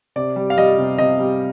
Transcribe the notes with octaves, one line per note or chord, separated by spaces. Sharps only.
C3 D5
G3
F5
G3 D#5
C3
C3 D#5
G3